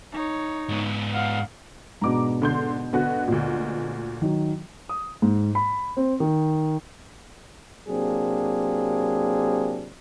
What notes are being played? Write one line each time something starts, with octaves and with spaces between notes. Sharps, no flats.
D#4 C#5
G#2 B3
F5 F#5
G#2 B2 D4 A#5 D6
D3 C6 G6
D3 B3 F#4
D2 A#2
D#3 F#3
D#6
G#2
B5
C4
D#3
C3 F#3 A#3 C4 D4 G#4